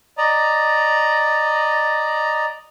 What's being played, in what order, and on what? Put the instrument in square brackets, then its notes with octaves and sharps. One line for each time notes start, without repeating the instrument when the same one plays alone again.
[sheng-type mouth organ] D5 D#5 A#5